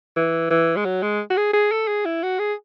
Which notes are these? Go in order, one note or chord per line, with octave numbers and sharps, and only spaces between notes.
E3
E3
G#3
F#3
G#3
F#4
G#4
G#4
A4
G#4
E4
F#4
G#4